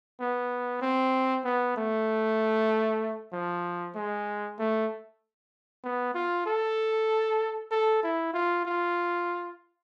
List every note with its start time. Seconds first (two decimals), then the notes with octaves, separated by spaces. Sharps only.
0.20 B3
0.82 C4
1.45 B3
1.77 A3
3.33 F3
3.95 G#3
4.59 A3
5.84 B3
6.15 F4
6.46 A4
7.72 A4
8.03 E4
8.34 F4
8.66 F4